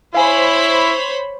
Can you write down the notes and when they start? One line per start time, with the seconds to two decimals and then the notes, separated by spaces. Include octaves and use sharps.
0.14 E4 G#4 C5 C#5 F5 B5